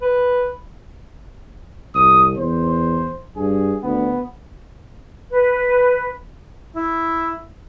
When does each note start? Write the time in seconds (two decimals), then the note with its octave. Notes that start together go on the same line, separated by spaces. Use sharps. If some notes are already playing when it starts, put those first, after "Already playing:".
0.02 B4
1.95 C2 D#6
2.37 E2 C5
3.36 G2 G#4
3.83 D2 B3
5.31 B4
6.76 E4